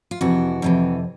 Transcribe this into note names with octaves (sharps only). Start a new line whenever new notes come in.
F4
F2 C3 E3 F#4
F2 C3 E3